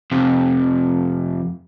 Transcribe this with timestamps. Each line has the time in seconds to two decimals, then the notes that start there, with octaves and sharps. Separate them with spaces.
0.12 F2 C3